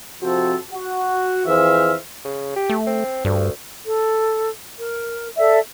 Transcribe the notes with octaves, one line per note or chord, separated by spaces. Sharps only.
C3 F3 C4 F#4 A4 C5
F#4
F2 E3 G#4 C5 E5 F5
C#3
G4
A3
C4
D2 G2
A4
A#4
A4 D5 E5